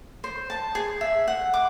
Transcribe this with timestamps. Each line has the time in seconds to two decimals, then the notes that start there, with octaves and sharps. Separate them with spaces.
0.24 C5
0.50 A5
0.75 G#4
1.01 E5
1.28 F#5
1.54 D6